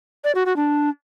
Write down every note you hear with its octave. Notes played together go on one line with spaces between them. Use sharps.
D5
F#4
F#4
D4